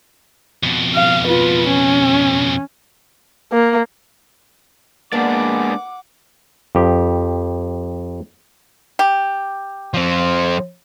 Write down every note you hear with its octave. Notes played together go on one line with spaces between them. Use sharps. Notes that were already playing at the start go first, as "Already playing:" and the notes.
F2 B2
F5
F4 B4
C#4
A#3
G#3 A#3 B3 D4 D5 F#5 D6
F2 G4
G4
F3 C4